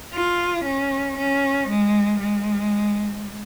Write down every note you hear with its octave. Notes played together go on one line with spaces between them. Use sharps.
F4
C#4
C#4
G#3
G#3